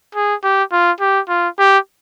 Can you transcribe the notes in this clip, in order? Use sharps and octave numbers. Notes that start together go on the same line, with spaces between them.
G#4
G4
F4
G4
F4
G4